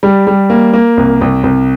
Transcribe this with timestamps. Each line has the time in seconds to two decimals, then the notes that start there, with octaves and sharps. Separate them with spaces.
0.03 G3
0.27 G3
0.50 A#3
0.74 A#3
0.97 C2
1.21 C2
1.44 C2